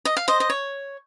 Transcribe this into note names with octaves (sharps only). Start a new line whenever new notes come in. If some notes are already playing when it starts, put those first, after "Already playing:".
D#5
F5
C5 D#5
D#5
C#5